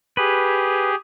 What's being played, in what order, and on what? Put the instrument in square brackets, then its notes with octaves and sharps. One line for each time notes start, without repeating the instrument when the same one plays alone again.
[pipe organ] G4 G#4 [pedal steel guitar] B4